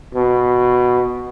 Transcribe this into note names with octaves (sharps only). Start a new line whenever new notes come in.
B2